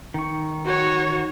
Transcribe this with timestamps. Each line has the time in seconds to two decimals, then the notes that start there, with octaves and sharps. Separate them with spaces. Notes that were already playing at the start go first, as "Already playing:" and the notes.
0.14 D#3 C#6
0.65 F#4 C#5